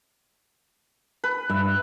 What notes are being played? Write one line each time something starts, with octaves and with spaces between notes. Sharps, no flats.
B4
G2 E5